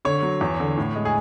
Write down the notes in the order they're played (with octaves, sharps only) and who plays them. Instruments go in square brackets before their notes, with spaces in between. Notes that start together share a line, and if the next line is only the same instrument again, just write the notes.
[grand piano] D3 C#5
F#3
E2
D3
A2
G#3
G#4